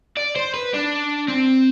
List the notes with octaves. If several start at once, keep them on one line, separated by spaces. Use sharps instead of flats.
D5
C5
B4
D4
C4